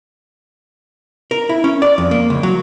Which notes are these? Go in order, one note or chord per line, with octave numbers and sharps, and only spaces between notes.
A#4
E4
C#4
D5
F2
A#3
C#2
F#3